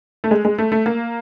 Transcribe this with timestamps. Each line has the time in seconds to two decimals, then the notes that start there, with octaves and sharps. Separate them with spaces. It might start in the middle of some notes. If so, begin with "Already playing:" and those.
0.24 A3
0.31 G#3
0.45 G#3
0.58 A3
0.72 A3
0.86 A#3